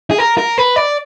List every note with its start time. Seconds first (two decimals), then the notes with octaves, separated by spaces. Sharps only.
0.11 G#4
0.19 A#4
0.38 A#4
0.58 B4
0.76 D5